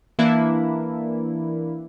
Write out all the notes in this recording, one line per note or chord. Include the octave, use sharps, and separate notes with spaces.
E3 A#3 D4 E4